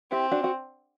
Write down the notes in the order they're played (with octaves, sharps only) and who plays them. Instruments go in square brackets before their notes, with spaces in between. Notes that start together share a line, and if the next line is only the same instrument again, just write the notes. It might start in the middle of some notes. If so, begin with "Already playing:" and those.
[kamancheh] C4 [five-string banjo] E4 G4
[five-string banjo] D4 F#4
F#4